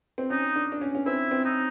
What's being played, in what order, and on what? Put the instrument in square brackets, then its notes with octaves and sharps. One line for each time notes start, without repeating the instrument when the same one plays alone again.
[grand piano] C4
[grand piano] C#4 [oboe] D#4
[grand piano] D4
D4
C#4
C#4
[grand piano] C4 [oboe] E4
[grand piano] C4
[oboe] D#4